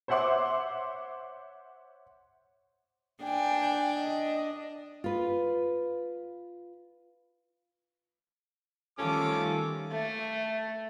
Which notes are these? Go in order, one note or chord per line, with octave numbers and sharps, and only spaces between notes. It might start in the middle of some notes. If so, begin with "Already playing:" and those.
C5 C#5 E5 F#5 C6 D6
D4 G5 G#5
D#5
F4 B4
D#3 F3 G3 A3 C#4 F4 A4 D6
A3